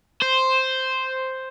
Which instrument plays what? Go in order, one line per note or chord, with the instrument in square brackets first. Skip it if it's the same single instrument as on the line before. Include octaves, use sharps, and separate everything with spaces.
[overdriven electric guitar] C5